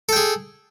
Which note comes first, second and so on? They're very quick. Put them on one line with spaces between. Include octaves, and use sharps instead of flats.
A4 G5 G#4